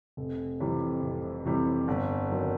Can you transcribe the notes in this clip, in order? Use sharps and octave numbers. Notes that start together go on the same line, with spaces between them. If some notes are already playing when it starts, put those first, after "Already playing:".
F1
F2 C3 E3 G3
F1
F2 C3 E3 G3
G1
D#3 F#3